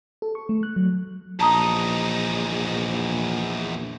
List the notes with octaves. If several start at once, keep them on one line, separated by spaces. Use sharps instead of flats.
A4
C#6
A3
F#6
F#3
A#1 E2 D#4 A5 A#5 D#6